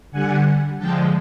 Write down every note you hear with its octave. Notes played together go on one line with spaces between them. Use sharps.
D3 G3 F#5 G#5
D3 F3 G#3 G5 A5